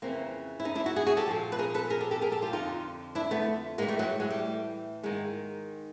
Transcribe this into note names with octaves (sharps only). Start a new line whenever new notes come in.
F2 C#3 E3 A#3 C4
E4
C#4 D#4
D4 E4
E4 F#4
F#4 G#4
F#4 G#4
G4 A4
A#2 F3
B4
G#4 A#4
A4 B4
G#4 A#4
G4 A4
G4 A4
G#4 A#4
G4 A4
F4 G4
F2 D3 F3 D#4 F4
D4 E4
A3 B3
A2 E3 G#3 A#3
G3 A3
F#3 G#3
F#3 G#3
G3 A3
G#2 D#3 G#3 A#3